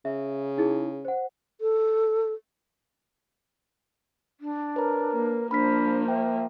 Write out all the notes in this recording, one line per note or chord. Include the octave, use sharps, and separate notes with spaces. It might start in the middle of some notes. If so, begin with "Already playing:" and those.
C#3 E5
D#4 E4 G#4
C5 F#5
A4
D4
A#4 B4 C#5 A#5
A#3
F3 A#3 D4 C5 B5 F6 B6
E5 G5